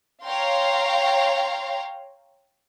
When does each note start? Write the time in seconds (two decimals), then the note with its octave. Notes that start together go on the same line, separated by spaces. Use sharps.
0.24 C#5 F5 G5 A#5 C6